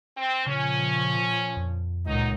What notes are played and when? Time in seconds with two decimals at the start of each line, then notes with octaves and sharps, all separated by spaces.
0.17 C4
0.46 A#2 C#3 F3 C#4
1.57 F2
2.06 C#2 A#2 F#3 D#4